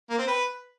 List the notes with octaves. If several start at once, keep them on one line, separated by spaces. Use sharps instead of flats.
A#3
C4
B4